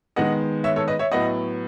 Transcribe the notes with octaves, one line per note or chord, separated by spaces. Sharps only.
D#3 G#3 B3 D#5 F#5
C#5 E5
A4 C#5
B4 D#5
C#5 E5
A2 F#3 B3 D#5 F#5